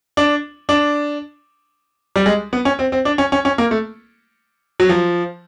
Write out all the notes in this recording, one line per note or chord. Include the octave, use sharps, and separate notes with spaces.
D4
D4
G3
G#3
B3
C#4
C4
C4
D4
C#4
C#4
C#4
A#3
A3
F#3
F3